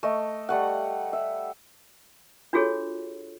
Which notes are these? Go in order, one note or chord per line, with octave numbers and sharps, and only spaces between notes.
A3 D#5
G3 A3 F#5
E5
D4 F4 F#4 G#4 A4 C#5